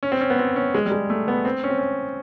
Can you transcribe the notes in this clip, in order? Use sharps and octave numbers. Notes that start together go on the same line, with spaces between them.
C#4
C4
C#4
B3
C4
C#4
G#3
G3
G#3
A3
B3
C4
C#4
C4
C#4